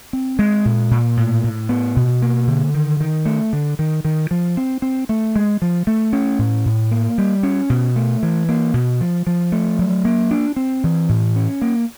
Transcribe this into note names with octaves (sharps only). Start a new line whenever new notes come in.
C4
G#3
A#2
A#2
A2
A2
B3
B2
A#3
D3
D#3
D#3
A3
D3
D#3
D#3
F3
C4
C4
A3
G#3
F3
A3
C#4
A2
A2
A#3
G3
C#4
B2
A3
E3
A#3
B2
F3
F3
A3
F#3
A#3
D4
C4
E3
A2
C#4
A#3